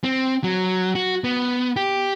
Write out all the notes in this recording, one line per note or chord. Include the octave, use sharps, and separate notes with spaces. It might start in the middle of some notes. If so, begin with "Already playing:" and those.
C4
F#3
F#4
B3
G4